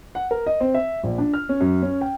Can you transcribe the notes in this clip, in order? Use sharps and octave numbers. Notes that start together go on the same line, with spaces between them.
F#5
A#4
D#5
C4
E5
A#1
D4
F6
C#4
F#2
C#4
G5